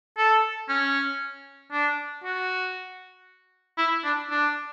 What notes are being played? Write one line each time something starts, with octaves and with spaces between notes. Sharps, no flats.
A4
C#4
D4
F#4
E4
D4
D4